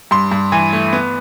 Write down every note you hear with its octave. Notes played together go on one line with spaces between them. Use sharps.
G2 C6
G2
E3
A3
B3